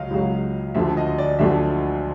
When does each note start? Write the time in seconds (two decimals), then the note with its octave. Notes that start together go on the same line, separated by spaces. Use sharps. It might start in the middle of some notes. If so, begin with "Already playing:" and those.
Already playing: C#2 C#3 F#3 D#5 F5
0.11 C#2 C#3 F#3
0.75 D2 D3 F3 E5
0.97 D#5
1.18 D5
1.39 D2 D3 F3 E5